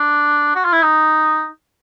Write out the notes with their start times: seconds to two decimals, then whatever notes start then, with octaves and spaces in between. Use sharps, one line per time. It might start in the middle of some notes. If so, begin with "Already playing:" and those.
Already playing: D4
0.55 F#4
0.65 F4
0.73 E4
0.82 D#4